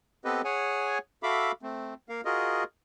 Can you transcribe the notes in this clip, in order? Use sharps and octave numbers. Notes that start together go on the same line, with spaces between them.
B3 C4 G4 A4 B4 D#5
G#4 C#5 F#5 G#5
F#4 A4 E5 F5 B5 D6
A3 C4
A#3 A#4 F5
F4 F#4 G#4 A#4 D#5